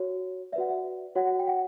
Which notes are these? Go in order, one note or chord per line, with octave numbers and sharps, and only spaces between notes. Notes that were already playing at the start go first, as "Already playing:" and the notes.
Already playing: F#4 C#5
F#4 B4 D5 E5 F#5
E5
F#4 C#5 F#5
G5
F#5